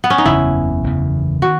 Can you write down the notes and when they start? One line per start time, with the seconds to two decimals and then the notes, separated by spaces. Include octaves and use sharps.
0.04 B3
0.10 C#4
0.18 D#4
0.25 F#1 E2 C#3 E3 E4
0.84 F#1 E2 C#3 E3
1.42 D#3 F#4